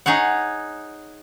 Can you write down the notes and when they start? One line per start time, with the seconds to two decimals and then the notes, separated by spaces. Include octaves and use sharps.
0.06 D#4 G#4 C#5 F#5